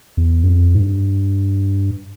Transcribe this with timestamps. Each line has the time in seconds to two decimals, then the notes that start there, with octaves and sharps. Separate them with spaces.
0.17 E2
0.43 F#2
0.48 F2
0.75 G#2
0.80 G2